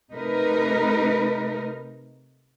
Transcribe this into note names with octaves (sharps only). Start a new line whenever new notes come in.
C3 A3 D#4 A#4 B4